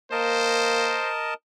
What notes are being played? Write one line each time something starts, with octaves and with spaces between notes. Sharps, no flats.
A#3 A#4 C5 D#5 A5